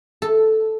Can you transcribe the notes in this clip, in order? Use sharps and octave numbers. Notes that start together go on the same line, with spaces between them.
A4